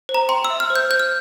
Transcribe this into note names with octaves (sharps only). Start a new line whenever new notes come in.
C5
A#5
G5 C6
E6
E5
F6
C5
G6
C5 G6
F6